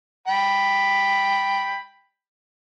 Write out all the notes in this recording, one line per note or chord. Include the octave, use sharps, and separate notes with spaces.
G5 B5